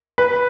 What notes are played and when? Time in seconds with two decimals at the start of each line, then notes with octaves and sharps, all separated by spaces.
0.18 B4